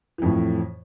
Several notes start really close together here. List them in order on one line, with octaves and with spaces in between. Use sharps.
E3 F2 A2